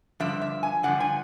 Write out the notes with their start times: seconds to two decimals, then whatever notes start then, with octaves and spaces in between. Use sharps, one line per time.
0.20 G2 D3 F3 E5
0.42 E5
0.63 G#5
0.83 G2 D3 F3 F#5
1.00 G#5